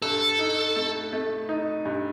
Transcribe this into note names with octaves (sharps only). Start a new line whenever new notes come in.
G2 A4
D#4
A3
A3
D#4
G2